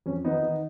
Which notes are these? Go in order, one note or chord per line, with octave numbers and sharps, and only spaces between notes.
F2 C#4
D#3 B3 D#4
D#3